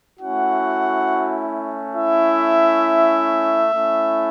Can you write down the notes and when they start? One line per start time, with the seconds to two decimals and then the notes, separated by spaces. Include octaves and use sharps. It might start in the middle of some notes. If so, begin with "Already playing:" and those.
0.19 A3 C#4 E4 F#4 F#5
1.96 E4 E5
3.73 A3 C#4 E4